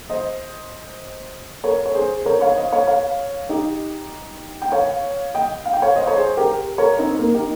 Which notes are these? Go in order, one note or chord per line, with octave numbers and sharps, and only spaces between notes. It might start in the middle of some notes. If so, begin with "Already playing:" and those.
C5 D#5
A#4 C#5
C#5
G#4 C5
A#4 C#5
C#5 F5
C5 D#5
C#5 F5
C#5 F5
D#4 G4
G5
C#5 F5
D#5 G5
F5
G5
C#5 F5
C5 D#5
C#5
G#4 C5
G4 A#4
A#4 C#5
C4 D#4
A#3
D#4 G4